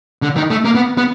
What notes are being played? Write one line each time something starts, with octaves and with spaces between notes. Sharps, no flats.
D3
D#3
A3
A#3
B3
B3